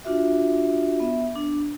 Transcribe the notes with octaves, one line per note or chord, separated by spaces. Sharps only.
D4 F4 F#4 E5
B3 E5
D4